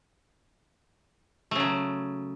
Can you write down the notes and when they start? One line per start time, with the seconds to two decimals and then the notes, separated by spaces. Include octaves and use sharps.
1.51 A3
1.56 C#3
1.60 F#3